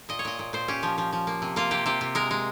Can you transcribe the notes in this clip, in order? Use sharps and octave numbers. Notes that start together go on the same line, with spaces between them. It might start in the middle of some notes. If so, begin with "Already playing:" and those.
A#2 D#5
C#5
A#2 D#5
A#2
A#2 C5
C#4 G4
F3
F3
F3
A#3
C3
A#3 F4
C3 G4
C3 G4
C3
G#3 A#4
G#3